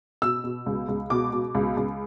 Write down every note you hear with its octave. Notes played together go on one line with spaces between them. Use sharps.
B2 E6
B2
C#2
C#2
B2 D6
B2
C#2
C#2